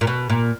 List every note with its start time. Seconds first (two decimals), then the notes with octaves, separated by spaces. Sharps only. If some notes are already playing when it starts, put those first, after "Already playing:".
0.01 A#2
0.07 B2
0.30 A#2